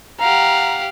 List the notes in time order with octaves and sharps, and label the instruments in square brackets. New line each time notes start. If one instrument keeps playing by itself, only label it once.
[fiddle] G4 F#5 [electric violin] F5 [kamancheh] A#5